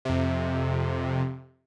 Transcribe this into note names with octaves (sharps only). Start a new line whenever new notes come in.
F2 C3